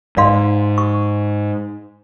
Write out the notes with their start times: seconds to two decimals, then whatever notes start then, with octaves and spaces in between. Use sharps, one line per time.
0.17 G#2 D5 F5 C6
0.78 C#6